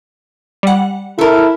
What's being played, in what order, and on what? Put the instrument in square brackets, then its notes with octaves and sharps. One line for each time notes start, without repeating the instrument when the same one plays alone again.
[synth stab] G3 F#5
[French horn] E4 [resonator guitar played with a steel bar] A4 A#4